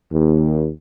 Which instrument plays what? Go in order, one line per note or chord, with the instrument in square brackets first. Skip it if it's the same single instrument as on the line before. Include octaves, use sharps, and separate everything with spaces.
[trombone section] D#2